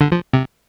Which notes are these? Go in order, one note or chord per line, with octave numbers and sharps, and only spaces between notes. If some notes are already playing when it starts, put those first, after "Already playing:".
D3
F3
C3